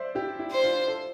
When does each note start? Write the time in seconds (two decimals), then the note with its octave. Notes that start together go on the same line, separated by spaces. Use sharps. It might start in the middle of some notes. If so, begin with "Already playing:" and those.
Already playing: C5 D5 E5
0.15 E4 G4
0.39 E4
0.51 C5
0.63 D4 F4
0.87 A4 C5